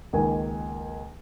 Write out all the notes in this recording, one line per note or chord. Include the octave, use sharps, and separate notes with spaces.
C#2 D#3 A#3 G#5